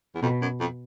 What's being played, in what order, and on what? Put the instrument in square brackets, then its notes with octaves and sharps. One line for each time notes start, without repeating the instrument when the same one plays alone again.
[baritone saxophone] E2
[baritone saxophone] F2 [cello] B2
[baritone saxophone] F#2
F2